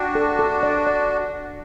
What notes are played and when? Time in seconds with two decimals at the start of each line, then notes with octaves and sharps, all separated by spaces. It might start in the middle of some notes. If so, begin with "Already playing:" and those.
Already playing: D4 F#4 G5
0.15 A4
0.39 A4
0.63 D5
0.87 D5